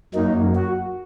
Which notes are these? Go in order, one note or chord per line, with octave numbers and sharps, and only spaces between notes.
F#2 F#3 A#3 D#4
F#4